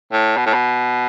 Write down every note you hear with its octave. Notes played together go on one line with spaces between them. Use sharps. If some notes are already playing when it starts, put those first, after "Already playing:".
A2
B2
A2
B2